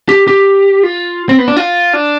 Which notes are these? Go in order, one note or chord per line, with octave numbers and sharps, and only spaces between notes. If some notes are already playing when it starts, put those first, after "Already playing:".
G4
G4
F4
C4
B3
D4
F4
D4